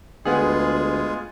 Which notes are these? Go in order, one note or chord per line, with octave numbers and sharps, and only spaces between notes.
D2 G#3 B3 F4 G#4